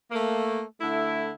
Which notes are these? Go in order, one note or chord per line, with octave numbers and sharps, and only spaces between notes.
A3 A#3
D3 A3 E4